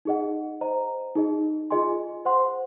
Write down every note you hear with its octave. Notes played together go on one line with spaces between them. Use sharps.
D#4 G#4 D#5 F#5
C5 D#5 A#5
D#4 G#4 D#5
F4 G#4 D#5 G#5 C6
C5 F#5 C6